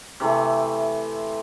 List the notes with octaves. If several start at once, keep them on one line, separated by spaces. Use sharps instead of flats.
C3 E3 A3